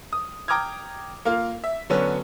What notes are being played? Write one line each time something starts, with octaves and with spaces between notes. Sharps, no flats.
D#6
G5 A#5 D6 D#6 F6 G#6
A#3 F4
E5
D3 F#3 B3 C#4